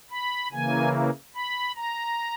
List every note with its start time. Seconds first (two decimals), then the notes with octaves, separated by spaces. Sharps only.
0.11 B5
0.52 C#3 E3 A#3 G#5
1.35 B5
1.76 A#5